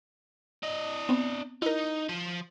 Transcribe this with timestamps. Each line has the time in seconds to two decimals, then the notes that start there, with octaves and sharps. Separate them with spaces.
0.63 D4 D#5
1.09 B3 C4
1.62 D#4 E4 A#4
2.09 F3